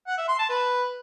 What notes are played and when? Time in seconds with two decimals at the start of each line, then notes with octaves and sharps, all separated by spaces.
0.07 F#5
0.17 E5
0.28 C6
0.39 A5
0.49 B4